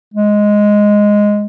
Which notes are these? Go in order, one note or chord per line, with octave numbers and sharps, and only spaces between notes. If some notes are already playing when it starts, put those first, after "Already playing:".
G#3